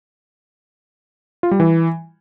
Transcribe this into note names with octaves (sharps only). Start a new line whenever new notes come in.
F4
G3
E3